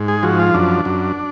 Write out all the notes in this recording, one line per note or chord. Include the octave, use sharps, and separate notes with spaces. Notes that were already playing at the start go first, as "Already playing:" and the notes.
Already playing: G#2
G#4
F3 F#4
F4
F#2 D4
F#2